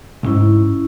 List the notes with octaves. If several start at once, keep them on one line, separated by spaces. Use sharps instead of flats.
B1 G#2 C#4 E4